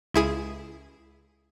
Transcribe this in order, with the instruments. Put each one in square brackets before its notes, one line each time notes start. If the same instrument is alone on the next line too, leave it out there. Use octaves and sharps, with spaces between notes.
[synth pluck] C#2 E4 G#4 G#6